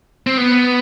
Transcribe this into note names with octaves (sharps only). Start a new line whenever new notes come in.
C4
B3